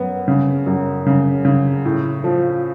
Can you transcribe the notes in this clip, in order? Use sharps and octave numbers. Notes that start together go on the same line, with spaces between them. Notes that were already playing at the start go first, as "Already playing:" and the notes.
Already playing: F#2 B3
C#3
F#2
C#3
C#3
A2
F3